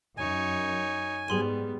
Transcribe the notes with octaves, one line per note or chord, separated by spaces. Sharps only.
F#2 D#4 C#5 G#5
G#2 G3 B3 G#4 C6 D#7